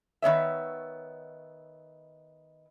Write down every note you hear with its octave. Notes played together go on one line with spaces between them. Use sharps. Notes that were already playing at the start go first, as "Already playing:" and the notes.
D#3 B3 C#5 E5